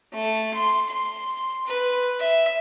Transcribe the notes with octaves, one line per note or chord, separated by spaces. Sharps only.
A3
C6
C6
B4
E5